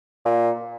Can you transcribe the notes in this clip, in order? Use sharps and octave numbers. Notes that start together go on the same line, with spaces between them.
A#2